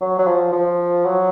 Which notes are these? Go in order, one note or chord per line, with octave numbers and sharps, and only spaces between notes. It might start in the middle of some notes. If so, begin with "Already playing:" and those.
F#3
F#3
F3
F3
F#3